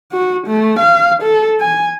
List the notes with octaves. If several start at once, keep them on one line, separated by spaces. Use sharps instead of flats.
F#4
A3
F5
A4
G#5